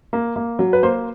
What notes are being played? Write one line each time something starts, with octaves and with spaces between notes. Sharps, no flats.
A#3
A#3
F#3
B4
A#3 C5